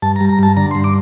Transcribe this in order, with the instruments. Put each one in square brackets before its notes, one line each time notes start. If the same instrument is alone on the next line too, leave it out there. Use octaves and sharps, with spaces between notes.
[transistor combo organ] G2 A5
A#5
G3
A#5
G2 A5
D3 A#5
G2 C6
D6